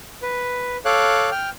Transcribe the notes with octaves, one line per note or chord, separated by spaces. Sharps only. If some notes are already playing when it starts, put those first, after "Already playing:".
B4
A4 C#5 F5 D6 F#6
G5 F6